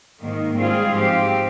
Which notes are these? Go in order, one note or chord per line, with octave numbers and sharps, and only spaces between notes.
G#2 D#3 A#3
G#2 G3 C4 F4 G#4
G#2 F3 C4 G4